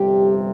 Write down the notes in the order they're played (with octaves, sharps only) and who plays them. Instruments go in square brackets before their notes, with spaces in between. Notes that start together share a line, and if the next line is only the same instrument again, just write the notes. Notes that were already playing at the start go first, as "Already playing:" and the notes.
Already playing: [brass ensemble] G1 F2 C3 G3 G4